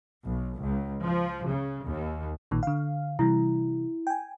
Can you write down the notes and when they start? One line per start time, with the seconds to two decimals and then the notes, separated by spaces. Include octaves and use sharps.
0.25 B1
0.59 C#2
1.05 F3
1.50 C#3
1.88 D#2
2.51 A1 A#2 D#3
2.63 D3 F5
3.19 C3 E3 G3 E4
4.07 G5 G#5